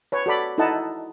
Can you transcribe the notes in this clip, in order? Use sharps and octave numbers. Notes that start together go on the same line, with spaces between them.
B4 C#5
F#4 A4 D5 B5
D#4 E4 A4 D#5 F#5 A5